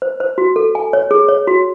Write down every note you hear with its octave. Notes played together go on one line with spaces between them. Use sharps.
C5
C5
F#4
A4
G#5
C#5
G#4
C#5
F#4